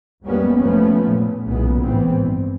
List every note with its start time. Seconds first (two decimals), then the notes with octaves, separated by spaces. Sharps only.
0.24 F2 G3 G#3 A#3 B3 C#4
0.58 F1 F3 A3 B3 C#4
1.07 A#2
1.45 B1 A#2 C#3 E3 G#3 B3
1.81 G#1 A2 E3 B3 C4
2.17 G2